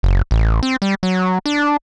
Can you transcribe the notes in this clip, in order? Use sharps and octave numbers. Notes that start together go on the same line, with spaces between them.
F#1
A1
C4
G3
F#3
D4